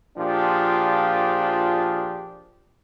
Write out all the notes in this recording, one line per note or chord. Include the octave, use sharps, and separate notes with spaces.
A#2 F3 D4 F4 G4 G#4